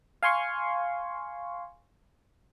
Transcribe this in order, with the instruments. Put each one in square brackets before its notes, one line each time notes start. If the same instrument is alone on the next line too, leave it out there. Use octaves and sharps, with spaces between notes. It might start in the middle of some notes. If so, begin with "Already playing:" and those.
[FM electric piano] F5 G#5 C6 C#6